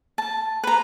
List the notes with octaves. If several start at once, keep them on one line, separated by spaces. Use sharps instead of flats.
A5
B4 A#5